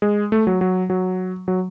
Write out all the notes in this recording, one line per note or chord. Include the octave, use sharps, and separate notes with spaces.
G#3
A3
F#3
F#3
F#3
F#3